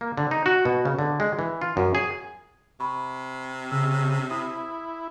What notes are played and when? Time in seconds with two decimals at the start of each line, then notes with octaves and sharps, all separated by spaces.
0.01 A#3
0.18 D3
0.31 D#4
0.46 F#4
0.65 B2
0.85 C#3
0.99 D3
1.20 G#3
1.39 E3
1.61 F4
1.77 F#2
1.95 G#4
2.80 C3 B5 C#6
3.72 C#3 E6
4.31 E4 D#6